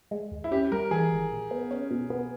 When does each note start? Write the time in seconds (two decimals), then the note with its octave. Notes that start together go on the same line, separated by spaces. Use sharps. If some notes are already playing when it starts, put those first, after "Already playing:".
0.11 G#3
0.31 D#2
0.44 E4
0.51 C#4 G4
0.72 G3 A#4
0.91 E3 G#4
1.11 G#1
1.32 A#1
1.51 B3
1.71 C#4
1.91 B2
2.10 B3